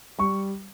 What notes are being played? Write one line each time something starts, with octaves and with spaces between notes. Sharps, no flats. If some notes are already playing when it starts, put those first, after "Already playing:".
G3 C#6